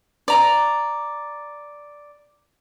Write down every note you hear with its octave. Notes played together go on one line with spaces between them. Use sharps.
D5 A#5